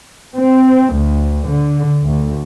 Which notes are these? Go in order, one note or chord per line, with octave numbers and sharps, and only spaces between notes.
C4
D2
D3
D2